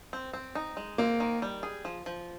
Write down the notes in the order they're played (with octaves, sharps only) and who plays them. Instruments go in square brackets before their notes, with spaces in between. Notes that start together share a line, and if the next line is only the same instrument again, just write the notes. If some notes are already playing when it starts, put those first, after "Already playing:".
[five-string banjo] C4
C4
D#4
G#3
[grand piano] A#3 [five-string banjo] C4
[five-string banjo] D#3
G3
G#4
F3
F3